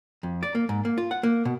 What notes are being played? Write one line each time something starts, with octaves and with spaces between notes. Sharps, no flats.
F2
D5
A#3
G#2
A#3
F4
F#5
A#3
B2